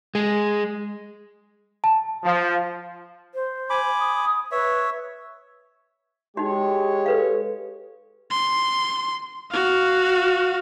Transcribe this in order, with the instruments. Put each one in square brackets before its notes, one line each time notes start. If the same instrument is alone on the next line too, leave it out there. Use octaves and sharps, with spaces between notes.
[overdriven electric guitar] G#3
[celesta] A5
[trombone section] F3
[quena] C5
[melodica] G#5 B5 D6
[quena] D#6
[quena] B4 [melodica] C#5 E5
[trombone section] G#3 [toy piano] D#4 F#4 [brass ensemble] G4 C#5
[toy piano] A4 B4 F5
[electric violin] C6
F#4 F5